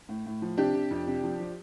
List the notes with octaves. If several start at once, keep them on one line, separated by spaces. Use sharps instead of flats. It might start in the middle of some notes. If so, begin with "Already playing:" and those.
A2
A2
F3
C3 D4 G4
C3
F2
C3
F3
F3